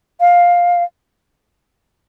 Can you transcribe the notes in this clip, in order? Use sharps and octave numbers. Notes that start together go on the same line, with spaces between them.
F5